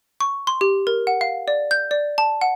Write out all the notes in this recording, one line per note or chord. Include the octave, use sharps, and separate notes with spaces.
C#6
C6
G4
A#4
F#5
F5
D5
G6
D5
A5
F#5